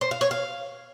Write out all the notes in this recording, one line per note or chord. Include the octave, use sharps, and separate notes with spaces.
C5
F5
C#5
F5